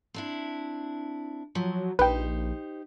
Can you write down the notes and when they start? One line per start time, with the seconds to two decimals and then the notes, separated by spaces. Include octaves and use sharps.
0.14 C4 D4 E4
1.55 F3 F#3
1.99 A#1 D#4 G4 B4 C5 G5